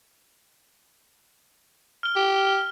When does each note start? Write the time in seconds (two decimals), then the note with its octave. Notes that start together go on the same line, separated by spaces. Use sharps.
2.03 F6 G7
2.16 G4